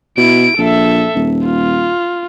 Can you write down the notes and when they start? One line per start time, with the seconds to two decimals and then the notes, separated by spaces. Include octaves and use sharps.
0.17 B2 E4 D7
0.58 A#1 A4 E5
1.15 D#1
1.46 F4